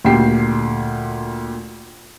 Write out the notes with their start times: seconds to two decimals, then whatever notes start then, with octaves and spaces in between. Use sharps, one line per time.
0.04 D2 A#2 G4 G5 C7